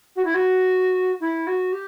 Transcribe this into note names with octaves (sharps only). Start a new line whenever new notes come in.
F#4
E4
F#4
E4
F#4
G4